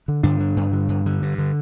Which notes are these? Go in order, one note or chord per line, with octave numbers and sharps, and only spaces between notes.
D3
G2 D3 D4
D3
G2
D3
G2
D3
G2
D3